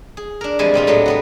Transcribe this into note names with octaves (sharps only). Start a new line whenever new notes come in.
G#4
D4 A#4
C3 E3 F3 G3 G#3 G#5
A#2 G3 G#3 F4
A2 C3 F#3 A3 B3
G3 B3 F#4